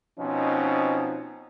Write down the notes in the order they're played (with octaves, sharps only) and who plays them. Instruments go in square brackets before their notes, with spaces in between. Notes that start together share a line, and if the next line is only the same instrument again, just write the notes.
[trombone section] B2 F3 C4 C#4 D#4